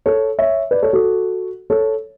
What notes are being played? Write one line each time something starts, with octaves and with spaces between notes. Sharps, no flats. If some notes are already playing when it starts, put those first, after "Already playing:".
A4 C#5
C#5 E5
B4 D5
A4 C#5
F#4 A4
A4 C#5